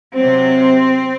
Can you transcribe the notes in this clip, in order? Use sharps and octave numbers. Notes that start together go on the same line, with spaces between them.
C3 F#3 C4